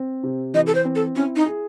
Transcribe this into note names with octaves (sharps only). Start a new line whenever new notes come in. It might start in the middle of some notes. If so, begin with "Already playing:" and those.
Already playing: C4
C3
E3 D#5
A4
C5
C4
A4
C#4 E4
D#4
G#4